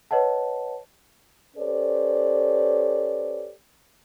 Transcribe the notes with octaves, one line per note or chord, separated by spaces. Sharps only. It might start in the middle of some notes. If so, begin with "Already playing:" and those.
B4 C#5 D#5 F#5 A5
C#4 G4 A4 B4 C5 D5